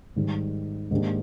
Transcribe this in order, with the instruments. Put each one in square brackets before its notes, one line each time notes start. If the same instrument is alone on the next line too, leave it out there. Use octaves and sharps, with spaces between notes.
[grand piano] G#2 D#3 G3
G#2 D#3 A#3 D4 G4